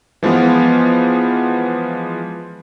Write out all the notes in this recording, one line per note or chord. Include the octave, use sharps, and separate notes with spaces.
E3 F3 G#3 B3 F4